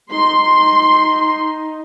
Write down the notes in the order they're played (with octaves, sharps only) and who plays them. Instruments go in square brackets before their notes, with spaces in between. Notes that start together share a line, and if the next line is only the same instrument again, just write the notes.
[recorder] D#4 [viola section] C6